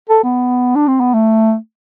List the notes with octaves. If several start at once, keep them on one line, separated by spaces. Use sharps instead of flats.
A4
B3
D4
C4
B3
A3